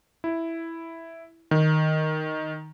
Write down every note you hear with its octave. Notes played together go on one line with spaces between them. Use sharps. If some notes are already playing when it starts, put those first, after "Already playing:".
E4
D#3